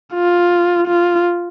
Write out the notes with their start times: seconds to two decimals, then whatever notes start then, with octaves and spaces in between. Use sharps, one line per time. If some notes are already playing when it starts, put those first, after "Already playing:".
0.15 F4
0.87 F4